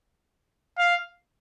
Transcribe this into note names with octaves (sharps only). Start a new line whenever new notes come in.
F5